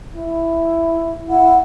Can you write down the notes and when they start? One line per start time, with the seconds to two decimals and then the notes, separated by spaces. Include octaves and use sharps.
0.15 E4
1.29 E4 F#5